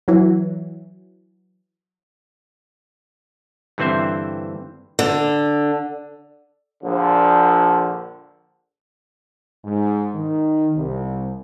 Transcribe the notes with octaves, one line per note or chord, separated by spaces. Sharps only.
E3 F#3
G2 D3 E3 C4 C5 E5
D3
A#1 D3 F3
G#2
D#3
C2